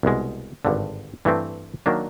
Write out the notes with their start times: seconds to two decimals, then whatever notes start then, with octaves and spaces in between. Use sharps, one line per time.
0.03 C2 B2 G#3
0.65 G#1 G2 D3
1.25 G2 E3 A3 C4
1.86 D#3 F#3 A#3 D4